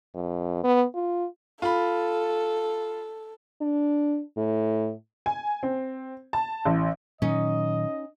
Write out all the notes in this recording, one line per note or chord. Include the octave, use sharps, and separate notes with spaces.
F2
B3
F4
F4 A4 B5
D4
A2
G#5
C4
A5
A1
A#2 D#3 F#3 C#4 D#4 D#5